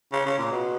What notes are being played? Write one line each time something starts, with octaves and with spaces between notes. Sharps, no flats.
C#3
C#3
A#2
B2